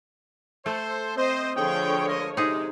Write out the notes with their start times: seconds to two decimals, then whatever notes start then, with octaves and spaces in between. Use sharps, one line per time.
0.66 A3 A4 C5
1.17 C4 C5 D#5
1.56 D3 F3 G#4 C#5 G5
2.08 G#3 A#4 D#5
2.37 C3 G#3 D#4 G#4